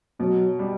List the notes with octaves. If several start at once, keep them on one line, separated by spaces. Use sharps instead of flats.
B2 F#3
G3